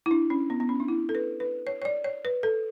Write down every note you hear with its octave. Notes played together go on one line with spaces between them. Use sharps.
E4
D4
C#4
B3
B3
C#4
D4
E4
A4
B4
B4
C#5
C#5
D5
C#5
B4
A4